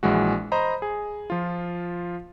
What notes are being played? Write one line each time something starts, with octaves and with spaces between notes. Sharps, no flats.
A#1 E3 G#3 F#4
C5 D#5 A#5 B5
G#4
F3 F4